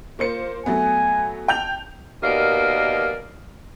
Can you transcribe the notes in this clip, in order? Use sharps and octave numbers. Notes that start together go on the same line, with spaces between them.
A#3 F4 C5 C#7
F#3 A3 B3 G#5
G5 A5 G6 F7
D#2 B2 A#4 D5 D#5 F5